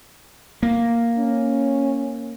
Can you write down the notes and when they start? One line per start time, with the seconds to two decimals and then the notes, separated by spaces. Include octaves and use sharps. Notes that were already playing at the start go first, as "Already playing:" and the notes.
0.63 A#3
1.18 C#4